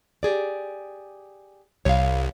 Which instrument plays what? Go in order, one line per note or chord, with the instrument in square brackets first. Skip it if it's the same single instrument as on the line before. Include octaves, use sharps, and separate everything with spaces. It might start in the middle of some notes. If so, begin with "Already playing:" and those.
[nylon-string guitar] G4 G#4 D5
[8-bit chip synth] C2 [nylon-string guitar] C#5 F5